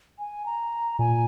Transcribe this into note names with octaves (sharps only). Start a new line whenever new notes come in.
G#5
A#5
A#2 G#5